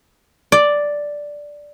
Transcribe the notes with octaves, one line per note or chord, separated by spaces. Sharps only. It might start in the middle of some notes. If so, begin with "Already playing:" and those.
D5